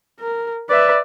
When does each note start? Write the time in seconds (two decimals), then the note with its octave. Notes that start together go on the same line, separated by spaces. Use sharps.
0.20 A#4
0.70 B4 D5 E5